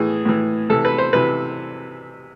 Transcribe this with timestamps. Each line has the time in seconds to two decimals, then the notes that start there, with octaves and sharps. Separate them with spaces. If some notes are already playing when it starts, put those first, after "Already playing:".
Already playing: A2 E3 G#4
0.25 A2 E3
0.69 C3 E3 A4
0.85 B4
0.98 C5
1.13 C3 E3 B4